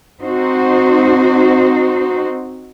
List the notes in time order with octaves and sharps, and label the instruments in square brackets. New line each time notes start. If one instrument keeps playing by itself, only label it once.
[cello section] C4 D#4 F#4 C5